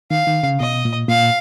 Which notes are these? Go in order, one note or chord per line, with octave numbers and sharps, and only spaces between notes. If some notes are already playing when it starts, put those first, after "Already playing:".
D#3 F5
D#3
C#3
B2 D#5
A#2
A#2 F5